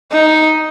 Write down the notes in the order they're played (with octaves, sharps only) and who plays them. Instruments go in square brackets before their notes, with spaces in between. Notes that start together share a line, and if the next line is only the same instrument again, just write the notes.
[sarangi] D#4